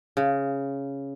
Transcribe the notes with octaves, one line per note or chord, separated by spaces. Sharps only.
C#3